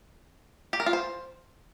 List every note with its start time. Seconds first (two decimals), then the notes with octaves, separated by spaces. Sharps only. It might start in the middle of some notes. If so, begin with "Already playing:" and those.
0.73 G4
0.80 A#4
0.86 F4
0.93 C5